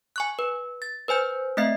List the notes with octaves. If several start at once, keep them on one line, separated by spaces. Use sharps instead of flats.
G#5 C#6 F#6
B4
A6
B4 C5 G#5 G6
A3 C4 D#5 E5 C7